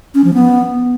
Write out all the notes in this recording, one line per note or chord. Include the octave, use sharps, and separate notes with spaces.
C#4
F3
B3